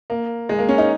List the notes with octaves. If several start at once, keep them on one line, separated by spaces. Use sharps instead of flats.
A#3
G#3
A#3
C#4
D#4